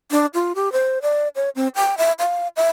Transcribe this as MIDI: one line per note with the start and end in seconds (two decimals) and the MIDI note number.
0.11 0.26 62
0.34 0.53 65
0.55 0.72 67
0.72 0.99 72
1.02 1.28 74
1.36 1.49 73
1.56 1.68 60
1.75 1.95 79
1.98 2.12 76
2.19 2.48 77
2.56 2.68 76